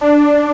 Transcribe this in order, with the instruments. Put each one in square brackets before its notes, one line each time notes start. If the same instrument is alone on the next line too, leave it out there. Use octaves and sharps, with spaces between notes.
[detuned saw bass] D4